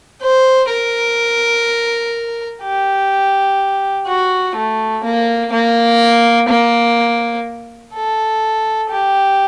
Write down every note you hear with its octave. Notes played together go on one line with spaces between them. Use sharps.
C5
A#4
G4
F#4
A3
A#3
A#3
A#3
A4
G4